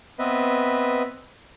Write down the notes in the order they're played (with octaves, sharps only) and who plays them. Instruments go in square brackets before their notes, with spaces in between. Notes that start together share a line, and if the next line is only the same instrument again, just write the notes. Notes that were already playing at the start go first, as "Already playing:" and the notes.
[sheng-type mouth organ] B3 C4 B4 D#5 E5